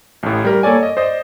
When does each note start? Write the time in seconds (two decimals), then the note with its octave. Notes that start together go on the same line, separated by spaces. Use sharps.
0.23 A1 A2
0.45 G3 A#4
0.63 A#3 A4 C#5 D5 G#5
0.83 D#5
0.97 C5 D5 D#5